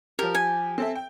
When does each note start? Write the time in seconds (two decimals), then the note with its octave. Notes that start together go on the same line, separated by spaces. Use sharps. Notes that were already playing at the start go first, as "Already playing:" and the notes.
0.19 F3 G4 A#4
0.35 G#5
0.78 C4 A4 E5
0.96 G5